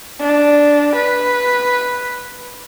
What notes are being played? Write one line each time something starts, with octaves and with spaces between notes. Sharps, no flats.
D4
B4